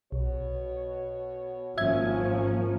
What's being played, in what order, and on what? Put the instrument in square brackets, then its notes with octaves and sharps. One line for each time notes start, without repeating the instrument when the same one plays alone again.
[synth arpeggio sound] B1 [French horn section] B2 F#4 C#5
[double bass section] G#1 A#3 C#4 [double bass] F3 [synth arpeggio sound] E5 G#6